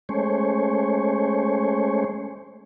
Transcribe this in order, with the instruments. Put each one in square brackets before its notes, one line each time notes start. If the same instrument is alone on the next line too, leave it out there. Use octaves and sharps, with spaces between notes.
[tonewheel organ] G#3 A3 C#4 C5 C#5